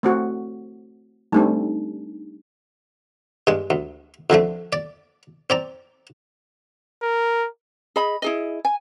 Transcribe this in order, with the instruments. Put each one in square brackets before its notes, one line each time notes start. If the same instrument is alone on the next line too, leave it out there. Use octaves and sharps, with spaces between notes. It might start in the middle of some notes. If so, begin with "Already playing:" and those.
[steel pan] A3 C4 F#4
[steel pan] G3 A3 C4 [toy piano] D4 D#4
[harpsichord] G2 G#3
D2
F2 D3 F3 A3
D5
C4 D5 A#5
[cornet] A#4
[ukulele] G#4 D#5 B5
E4 G#4 D#5
G#5